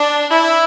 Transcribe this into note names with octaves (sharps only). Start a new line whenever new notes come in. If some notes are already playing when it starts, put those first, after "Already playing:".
Already playing: D4
E4